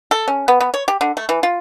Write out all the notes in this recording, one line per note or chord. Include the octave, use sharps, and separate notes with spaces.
A4
C#4
B3
B3
C#5
G4
D3
A3
E3
F4